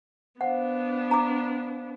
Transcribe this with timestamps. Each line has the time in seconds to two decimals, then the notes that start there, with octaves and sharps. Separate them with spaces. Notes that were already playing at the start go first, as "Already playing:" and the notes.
0.41 B3 D4 C5 F5 F#5
1.11 A#5 D6